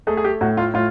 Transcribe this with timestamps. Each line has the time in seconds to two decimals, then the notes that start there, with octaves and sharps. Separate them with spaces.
0.07 A3 G#4
0.17 G#4
0.24 G4
0.41 A2 F#4
0.57 F4
0.74 A2 F4